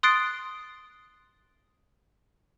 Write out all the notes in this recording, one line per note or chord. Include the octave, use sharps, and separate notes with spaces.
C6 D#6 F#6 A6 C7 D7